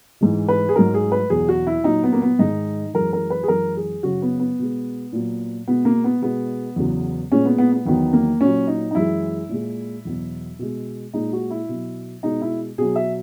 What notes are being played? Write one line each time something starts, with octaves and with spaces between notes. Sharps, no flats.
G#2 E3 G#3
B4
G#4
G#2 F#3 A#4
G#4
B4
E2 B2 F#3 G#4
F#4
E4
A#2 F#3 D#4
B3
A#3
B3
G#2 D#3 G#3 D#4
F#2 E3 G#3 A#4
A#4
B4
G#4
F#2 E3 G#3 A#4
G#4
F#2 C#3 F#3 F#4
B3
B3
B2 G#3
A#2 F#3
B2 G#3 B3
A#3
B3
B2 G#3 B3
E2 C#3 F#3
A#2 G#3 C#4
B3
B3
B3
E2 D#3 F#3 B3
A#3
A#2 F#3 C#4
D#4
D#4
F#2 E3 G#3 E4
A#2 G#3
E2 B2 F#3
B2 G#3
A#2 G#3 D#4
F#4
E4
B2 F#3
B2 G#3 D#4
E4
B2 F#3 G#4
E5